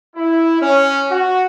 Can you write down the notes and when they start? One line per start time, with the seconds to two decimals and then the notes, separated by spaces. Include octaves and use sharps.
0.15 E4
0.60 C#4
1.09 F#4